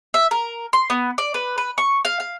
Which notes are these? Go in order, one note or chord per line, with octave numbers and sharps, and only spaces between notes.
E5
A#4
C6
B3
D5
B4
B4
C#6
F5
F5